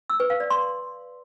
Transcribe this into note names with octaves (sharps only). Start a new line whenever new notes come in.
E6
B4
F5
D5
C6